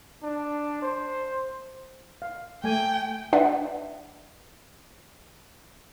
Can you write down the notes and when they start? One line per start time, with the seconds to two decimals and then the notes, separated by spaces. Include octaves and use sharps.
0.23 D4
0.82 C5
2.22 F5
2.64 A3 G5 G#5
3.33 D4 B4 D5 E5 F#5